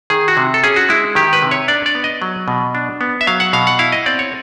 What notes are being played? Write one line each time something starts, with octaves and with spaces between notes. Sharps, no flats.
D#3 G#4
F#4
C3
A4
C#4 G#4
F#4
G#3 E4
D#3 G4
B4
C3
C#5
D4 D5
D5
B3
D#5
F#3
B2
D4
B3
E5
F#3 F5
F#5
B2 F5
F#5
E4 F5
D#5
C4 D5
C#5